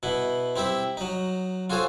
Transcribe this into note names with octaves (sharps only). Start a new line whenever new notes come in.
B2 B3 E4
C4 E4 G4 E5
F#3 D#4
F4 F#4 G#4 A4 C5 C#5